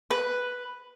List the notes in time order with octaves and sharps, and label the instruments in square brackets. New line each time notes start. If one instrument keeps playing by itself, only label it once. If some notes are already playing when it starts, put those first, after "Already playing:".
[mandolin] B4